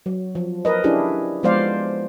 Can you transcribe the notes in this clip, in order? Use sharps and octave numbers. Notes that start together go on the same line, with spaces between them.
F#3
F3
A#4 B4 D#5
C#4 D4 E4 G4 G#4
F3 G#3 B3 C5 D5 F5